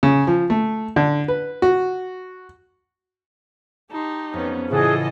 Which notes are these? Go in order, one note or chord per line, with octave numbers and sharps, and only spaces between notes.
C#3
F3
A3
D3
B4
F#4
D#4 G4 A5 C6
F2 B3 C#4
A2 C#3 E3 F4 G#4 A4 D#5 F#5